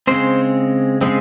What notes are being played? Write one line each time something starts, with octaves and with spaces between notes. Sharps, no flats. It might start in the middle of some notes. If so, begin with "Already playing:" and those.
C#3 G#3 C4 C5
C#3 G#3 C4